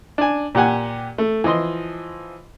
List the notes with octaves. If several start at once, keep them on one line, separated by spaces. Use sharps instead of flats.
D4 G#5
A#2 G4 F#5 G#5
A3
E3 F3 D#5 C6